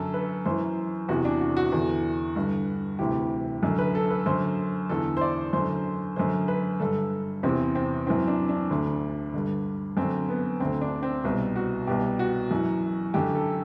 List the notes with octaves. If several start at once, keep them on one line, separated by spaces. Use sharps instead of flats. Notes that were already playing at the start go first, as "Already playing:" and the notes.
Already playing: F#2 D3 A4
B4
F#2 E3 C5
E2 C3 E3 F#4
D4
F#4
F#4
E2 D3
G2 D3
D2 C3 E3 G4
F#2 D3
B4
A4
B4
F#2 D3 C5
E2 D3 A4
C5
D5
F#2 D3 C5
F#2 D3 C5
B4
G2 D3 A4
E2 C3 E3 C4
C4
F#2 E3 C4
D4
D4
D2 D3
G2 D3
F#2 D3 C4
B3
D2 D3 C4
D4
C4
C2 B2
F#4
C2 B2 G4
F#4
F#2 E3
F#2 D3 G4
A4